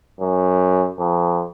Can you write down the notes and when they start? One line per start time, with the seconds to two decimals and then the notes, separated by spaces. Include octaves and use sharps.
0.20 F#2
0.99 F2